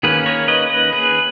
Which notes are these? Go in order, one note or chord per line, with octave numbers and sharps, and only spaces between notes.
D#3 A#3 C#4 G#4 B4
A#4 C#5
B4 D#5
B4 D#5
G#4 B4